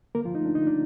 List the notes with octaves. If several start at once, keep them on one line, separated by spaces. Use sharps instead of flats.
D3 A#3 A#4
F3 F4
A3 D#4
D4
D3 D#4
D4